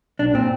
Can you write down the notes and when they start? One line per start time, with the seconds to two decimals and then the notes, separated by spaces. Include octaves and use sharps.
0.19 B1 D4
0.34 A#2 C4